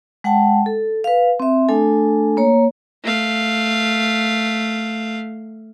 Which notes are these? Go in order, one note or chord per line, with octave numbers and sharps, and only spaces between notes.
G#3 F#5 G5 A5
A4
B4 F5
C4 E5
A3 D4 A4 G#5
A#3 C#5 A#5
A3 F5